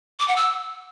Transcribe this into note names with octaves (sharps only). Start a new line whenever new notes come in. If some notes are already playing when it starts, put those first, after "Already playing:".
D6
F#5
E6